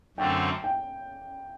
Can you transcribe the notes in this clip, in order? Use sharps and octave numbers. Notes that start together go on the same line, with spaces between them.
F#2 D3 A3 C4 G5
G5